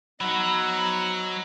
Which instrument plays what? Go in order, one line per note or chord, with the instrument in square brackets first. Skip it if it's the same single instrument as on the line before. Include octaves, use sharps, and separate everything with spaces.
[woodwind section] F3 B3 E6 [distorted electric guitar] F#3 [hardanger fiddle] D#4 F#5 [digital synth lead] B5